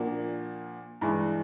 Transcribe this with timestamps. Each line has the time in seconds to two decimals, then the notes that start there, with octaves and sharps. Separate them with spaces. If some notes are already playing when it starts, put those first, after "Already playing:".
Already playing: A#2 F3 A#3 D4 F#4
1.01 G2 E3 G#3